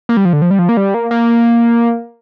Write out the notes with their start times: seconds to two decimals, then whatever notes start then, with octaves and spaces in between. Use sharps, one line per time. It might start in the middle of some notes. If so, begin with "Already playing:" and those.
0.09 A#3
0.17 G3
0.25 F3
0.33 D3
0.42 F3
0.51 G3
0.59 F3
0.69 A#3
0.77 G3
0.94 A#3
1.11 A#3